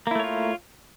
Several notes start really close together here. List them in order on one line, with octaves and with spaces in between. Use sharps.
A#3 E4 A3 C#5 F4